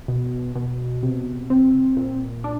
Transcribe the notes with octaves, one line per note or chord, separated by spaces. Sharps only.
B2
B2
C3
C4
A#2
D4